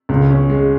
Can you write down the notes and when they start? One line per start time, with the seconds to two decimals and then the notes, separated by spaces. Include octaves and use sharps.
0.09 C#2
0.30 C#4
0.49 G#3